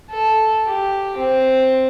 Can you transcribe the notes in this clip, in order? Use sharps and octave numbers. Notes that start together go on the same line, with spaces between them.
A4
G4
C4